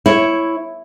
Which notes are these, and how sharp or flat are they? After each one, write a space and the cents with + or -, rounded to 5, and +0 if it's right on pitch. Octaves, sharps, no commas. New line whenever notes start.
E4 +0 C#5 -5